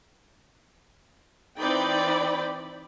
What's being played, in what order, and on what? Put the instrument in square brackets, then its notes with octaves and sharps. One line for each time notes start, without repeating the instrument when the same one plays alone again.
[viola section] E3 C4 D#4 D5 G5 B5